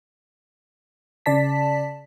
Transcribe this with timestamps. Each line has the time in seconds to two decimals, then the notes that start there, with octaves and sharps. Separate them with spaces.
1.26 C#3 D5 A5 B6